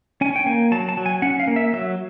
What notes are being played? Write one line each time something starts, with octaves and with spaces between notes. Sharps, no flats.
C#4 G#5
G5
A#3 G#5
F#3 A5
A5
F#3
G#5
C#4 F#5
F5
A#3
E5
F#3 E5